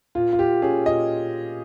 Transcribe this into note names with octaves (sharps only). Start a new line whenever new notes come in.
A#2 F4
F4
A#2 G4
C#4 G#4
A#2 D#5